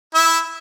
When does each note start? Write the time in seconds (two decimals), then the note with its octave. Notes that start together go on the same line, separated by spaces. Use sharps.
0.14 E4 E5